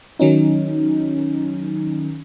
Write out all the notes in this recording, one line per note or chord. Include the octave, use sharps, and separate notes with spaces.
D#3 F#3 C#4 D#4